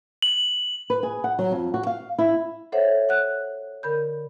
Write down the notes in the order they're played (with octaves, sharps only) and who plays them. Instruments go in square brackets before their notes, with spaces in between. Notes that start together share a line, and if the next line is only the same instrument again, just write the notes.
[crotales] F#7
[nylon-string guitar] B4
G#4
F#5
F#3
F2
F#4
F5
E4
[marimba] A4 C5 C#5 E5 F#5
F#5 F#6
D3 A#4 B5 G6